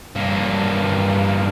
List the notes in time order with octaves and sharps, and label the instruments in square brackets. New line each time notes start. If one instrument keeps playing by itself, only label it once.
[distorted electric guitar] G2 A#3